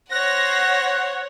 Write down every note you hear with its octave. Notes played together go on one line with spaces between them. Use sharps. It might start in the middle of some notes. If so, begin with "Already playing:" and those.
C5 C#5 F#5 F#6 A#6